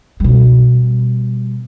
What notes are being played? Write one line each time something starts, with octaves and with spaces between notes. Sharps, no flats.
B2 G3